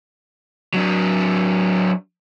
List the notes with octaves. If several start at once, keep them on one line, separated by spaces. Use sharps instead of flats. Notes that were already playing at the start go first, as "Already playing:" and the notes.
F#3 D4